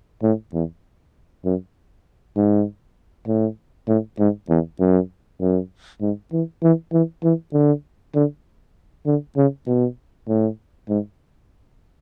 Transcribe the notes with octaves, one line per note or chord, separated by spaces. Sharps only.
A2
E2
F#2
G#2
A2
A2
G#2
E2
F#2
F#2
G#2
E3
E3
E3
E3
D3
D3
D3
C#3
B2
A2
G#2